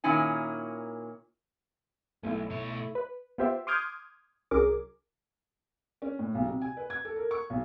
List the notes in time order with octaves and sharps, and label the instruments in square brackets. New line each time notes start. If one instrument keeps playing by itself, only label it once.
[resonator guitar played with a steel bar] A#2 D#3 C#4 E4 G#5
[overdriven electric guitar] B1 [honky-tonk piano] A3 E4
[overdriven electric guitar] B2 C#5
[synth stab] B4
B3 F4 G4 C5 E5
C6 D6 D#6 F6 G6 G#6
C2 F#3 C#4 G#4 A#4 D6
[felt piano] C#4
A2
B1
C3
G#5
B4
G#6
A4
A#4
C#6
B1